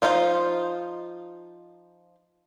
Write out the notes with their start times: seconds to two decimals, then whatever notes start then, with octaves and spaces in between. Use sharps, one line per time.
0.02 F3 D#4 F4 C5 F5